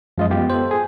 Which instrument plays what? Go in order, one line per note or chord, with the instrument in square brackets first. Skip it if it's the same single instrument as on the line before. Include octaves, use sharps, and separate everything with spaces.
[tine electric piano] F#2 G#3 [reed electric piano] F3 F4 D#5
[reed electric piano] B3 F4 G4
[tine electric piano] A4 C5
[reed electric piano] G#4